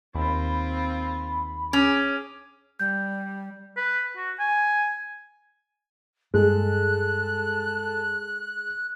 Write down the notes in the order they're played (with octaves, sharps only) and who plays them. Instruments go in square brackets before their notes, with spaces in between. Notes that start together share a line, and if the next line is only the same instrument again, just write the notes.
[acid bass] D#2 [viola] C4 F4 [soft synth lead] B5
[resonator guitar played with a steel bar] C#4 [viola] G#4 D6
[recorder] G3 [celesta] G6
[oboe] B4
F#4
G#5
[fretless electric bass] G2 [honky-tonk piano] G#3 [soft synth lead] A4 [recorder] F#6